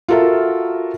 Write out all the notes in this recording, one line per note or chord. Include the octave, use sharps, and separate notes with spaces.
F4 F#4 A4 A#4 E5